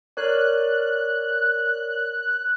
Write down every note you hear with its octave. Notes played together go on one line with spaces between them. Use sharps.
A#4 C#5 D5 F#6